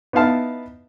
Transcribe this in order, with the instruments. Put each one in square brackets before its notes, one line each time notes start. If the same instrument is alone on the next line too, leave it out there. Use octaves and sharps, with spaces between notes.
[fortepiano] B3 D#4 E4 F5 A5